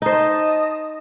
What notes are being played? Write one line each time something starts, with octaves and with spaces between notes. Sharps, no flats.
D#4 C5 D#5 A5